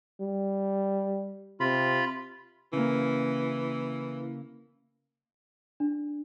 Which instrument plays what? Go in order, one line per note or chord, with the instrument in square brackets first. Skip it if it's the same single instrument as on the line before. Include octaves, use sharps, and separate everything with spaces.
[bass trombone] G3
[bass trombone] C3 [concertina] F4 B5
[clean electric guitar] C#3 A#3 [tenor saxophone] E3
[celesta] D4